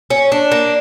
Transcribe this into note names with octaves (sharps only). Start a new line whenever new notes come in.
C#4
D4
A#3